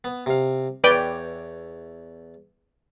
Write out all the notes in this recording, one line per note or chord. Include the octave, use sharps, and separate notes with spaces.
B3
C3 F5
E2 B4 C#5 D5 G5